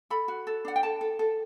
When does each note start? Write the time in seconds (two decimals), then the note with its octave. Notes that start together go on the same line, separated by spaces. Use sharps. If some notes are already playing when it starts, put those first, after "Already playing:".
0.10 A4 B5
0.28 F#4
0.47 A4
0.65 D4 F#5
0.76 G5
0.83 A4 A5
1.01 A4
1.19 A4